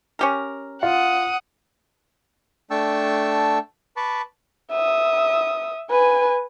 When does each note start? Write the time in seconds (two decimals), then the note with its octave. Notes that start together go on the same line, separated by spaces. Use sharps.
0.19 C#4 G4 A#4
0.83 F4 F#5 D#6
2.71 A3 D4 G5 A5 C#6 E6
3.97 B4 A5 B5 C#6 D6
4.71 E5 D#6
5.90 B4 G#5